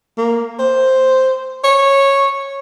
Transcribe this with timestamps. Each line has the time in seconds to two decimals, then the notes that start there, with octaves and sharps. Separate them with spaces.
0.18 A#3
0.59 C5
1.64 C#5